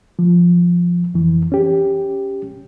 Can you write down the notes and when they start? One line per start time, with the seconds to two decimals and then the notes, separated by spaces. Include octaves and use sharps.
0.19 F3
1.14 F2 E3
1.52 C#4 G4